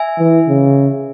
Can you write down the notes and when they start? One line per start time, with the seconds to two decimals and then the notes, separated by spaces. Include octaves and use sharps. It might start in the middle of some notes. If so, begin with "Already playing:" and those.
Already playing: E5 G#5
0.19 E3
0.48 C#3